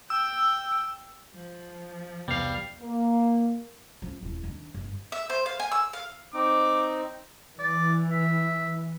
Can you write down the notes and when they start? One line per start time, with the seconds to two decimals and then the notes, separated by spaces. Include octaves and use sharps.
0.10 G5 E6
1.34 F3
2.28 E1 C2 G3 B3 F5
2.81 A#3
4.02 F3 C#4
4.23 D#1 E4
4.44 D#3 D4
4.74 G1
5.12 E5
5.30 C5
5.46 F5
5.60 G#5
5.72 E6
5.93 F5
6.34 C4 D#4 D6
7.59 E3 D5
8.11 E5